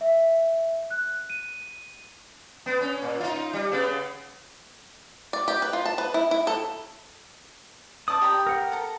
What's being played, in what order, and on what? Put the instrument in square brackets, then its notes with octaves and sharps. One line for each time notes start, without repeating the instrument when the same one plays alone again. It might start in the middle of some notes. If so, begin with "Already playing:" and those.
[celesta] E5
F#6
D#7
[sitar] B3
C#4
A#2
D#4 F4
G3
C#3 B3
[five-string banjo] D5
G4
B4
F4
A5
B4
E4
E4
A4
[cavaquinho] D5 A5 D6 [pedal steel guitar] D#6
[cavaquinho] G4 A#5 B5
[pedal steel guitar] A#4 F#5
[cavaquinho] A4 A#5